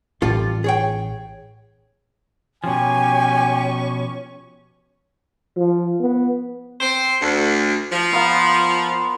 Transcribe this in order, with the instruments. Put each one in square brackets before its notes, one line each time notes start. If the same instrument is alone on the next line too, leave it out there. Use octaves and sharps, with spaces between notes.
[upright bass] A1 [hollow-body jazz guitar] G3 F4 A4
[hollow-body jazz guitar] G#4 C#5 G5
[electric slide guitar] B2 F3 [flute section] C#4 G4 C#6 [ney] G5 [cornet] G#5
[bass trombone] F3
B3
[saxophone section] C4 C5
D2
F3
[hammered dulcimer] B3 F4 A#4